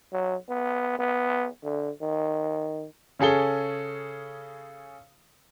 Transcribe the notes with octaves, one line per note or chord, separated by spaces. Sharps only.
F#3
B3
B3
D3
D#3
C#3 C#4 G#4 A4 G7